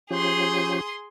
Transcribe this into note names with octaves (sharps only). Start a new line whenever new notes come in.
F3 C#4 G4 G#4 C6